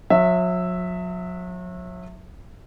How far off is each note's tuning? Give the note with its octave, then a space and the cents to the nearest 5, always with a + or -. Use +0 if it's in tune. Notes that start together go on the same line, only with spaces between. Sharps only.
F#3 -40 E5 +0